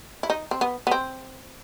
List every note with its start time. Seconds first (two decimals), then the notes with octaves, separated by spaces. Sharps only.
0.23 E4
0.30 D#4
0.51 C4
0.61 B3
0.87 B3
0.91 C4